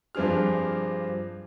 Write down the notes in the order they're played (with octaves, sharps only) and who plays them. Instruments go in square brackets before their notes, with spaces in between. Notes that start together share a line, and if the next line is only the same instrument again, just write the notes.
[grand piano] G2 F3 C4 D4 G#4 F6